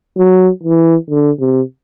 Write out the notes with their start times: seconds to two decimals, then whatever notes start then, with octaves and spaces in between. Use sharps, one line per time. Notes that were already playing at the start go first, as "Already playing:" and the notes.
0.17 F#3
0.63 E3
1.10 D3
1.40 C3